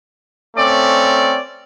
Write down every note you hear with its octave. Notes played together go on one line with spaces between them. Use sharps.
A3 C4 C#4 D5